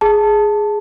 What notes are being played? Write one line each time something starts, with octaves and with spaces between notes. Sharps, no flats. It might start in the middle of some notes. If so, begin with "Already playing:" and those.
G#4 A5